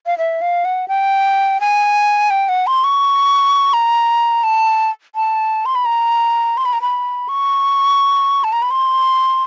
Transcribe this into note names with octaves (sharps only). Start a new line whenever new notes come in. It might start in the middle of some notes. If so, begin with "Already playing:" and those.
F5
E5
F5
F#5
G5
G#5
G5
F#5
C6
C#6
A#5
A5
A5
C6
B5
A#5
C6
B5
A#5
B5
C#6
A5
A#5
B5
C6